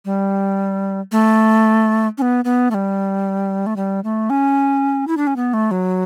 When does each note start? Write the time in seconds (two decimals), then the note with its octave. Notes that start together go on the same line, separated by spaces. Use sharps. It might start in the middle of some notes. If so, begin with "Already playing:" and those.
0.05 G3
1.12 A3
2.18 C#4
2.22 B3
2.45 B3
2.71 A3
2.74 G3
3.66 A3
3.76 G3
4.04 A3
4.30 C#4
5.07 E4
5.17 D4
5.27 C#4
5.36 B3
5.54 A3
5.71 F#3